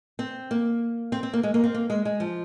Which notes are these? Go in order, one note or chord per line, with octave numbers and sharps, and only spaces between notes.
C4
A#3
C4
C4
A#3
G#3
A#3
C4
A#3
G#3
G#3
F3